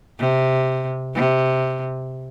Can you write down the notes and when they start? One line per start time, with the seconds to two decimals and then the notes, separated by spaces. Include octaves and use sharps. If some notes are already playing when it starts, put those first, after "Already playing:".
0.19 C3
1.14 C3